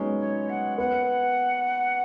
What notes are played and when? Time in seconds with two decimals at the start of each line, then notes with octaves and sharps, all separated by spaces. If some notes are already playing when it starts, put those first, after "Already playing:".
Already playing: F#3 G#3 B3 C#4 D#4
0.20 C#5
0.49 F#5
0.78 B3 F#5